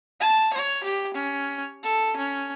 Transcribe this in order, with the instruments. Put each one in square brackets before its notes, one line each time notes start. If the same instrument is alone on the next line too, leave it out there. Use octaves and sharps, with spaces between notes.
[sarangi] A5
C#5
G4
C#4
A4
C#4